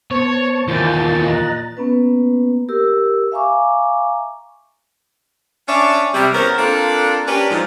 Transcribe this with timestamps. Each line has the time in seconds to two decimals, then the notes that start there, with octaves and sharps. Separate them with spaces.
0.11 B3 C5 C#5 A5 C#6
0.68 D#2 A#2 E3 E4 A5 G6 A6
1.24 D#5 A#5 F#6
1.77 A#3 B3 C#4 B4
2.69 G4 A#4 E6
3.32 E5 F5 G#5 A#5 C#6 D6
5.68 C#4 D4 C#5 D5 E5
6.14 C3 G3
6.34 E2 B3 C#4 A#4 C5
6.58 A#3 C4 D4 F4 A4
7.27 C#4 D4 G4 A#4 B4 D5
7.51 G#2 F3